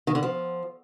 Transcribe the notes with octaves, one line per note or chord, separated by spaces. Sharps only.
D#3
D3
F3